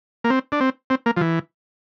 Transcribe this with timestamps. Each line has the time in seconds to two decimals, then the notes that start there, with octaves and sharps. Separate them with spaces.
0.24 A#3
0.30 C4
0.52 D4
0.61 C4
0.90 C4
1.06 A#3
1.17 F3
1.21 E3